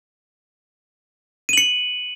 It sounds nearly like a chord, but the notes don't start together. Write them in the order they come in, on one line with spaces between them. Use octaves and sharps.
D#7 F#7 C#7